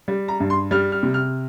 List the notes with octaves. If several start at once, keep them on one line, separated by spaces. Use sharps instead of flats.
G3
A#5
G2
C6
G3 F6
F6
C3
F6